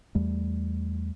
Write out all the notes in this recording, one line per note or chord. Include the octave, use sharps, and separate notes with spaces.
E2 G3 A3